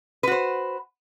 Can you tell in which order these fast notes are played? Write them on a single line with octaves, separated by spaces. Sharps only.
B4 F#4 C5